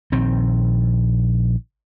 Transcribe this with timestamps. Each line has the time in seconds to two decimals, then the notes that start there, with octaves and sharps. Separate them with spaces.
0.12 A#1 D#3 C4